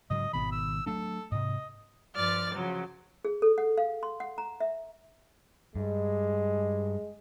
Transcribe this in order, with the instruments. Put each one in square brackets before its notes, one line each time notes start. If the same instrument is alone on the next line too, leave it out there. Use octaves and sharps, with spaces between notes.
[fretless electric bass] G#2 C#3 F#3 [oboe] D#5
[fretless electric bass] G#1 B2 D#3 [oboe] B5
[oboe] E6
[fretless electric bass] F#3 A3 D4 [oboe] A4
[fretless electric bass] G#2 C3 [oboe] D#5
[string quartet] G2 F3 D5 F6 A6
C#3 F3 F#3
[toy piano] G#4
A4
F#5
F5
C6
F#5
A#5
E5
[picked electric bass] G2 [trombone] G#3